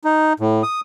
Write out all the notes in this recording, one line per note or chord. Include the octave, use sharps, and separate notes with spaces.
D#4
A2
D#6